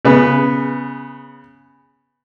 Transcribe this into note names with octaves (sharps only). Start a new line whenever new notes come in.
C#3 B3